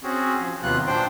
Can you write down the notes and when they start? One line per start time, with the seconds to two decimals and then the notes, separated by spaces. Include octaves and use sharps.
0.03 C4 C#4 F#4 G#4
0.41 F3
0.63 D#2 C3 F#3 B3 F4 F#6
0.87 A#2 D4 C5 G5